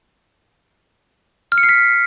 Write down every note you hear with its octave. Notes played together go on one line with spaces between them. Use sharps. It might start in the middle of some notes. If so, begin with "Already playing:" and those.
F6
C#7
C7
B6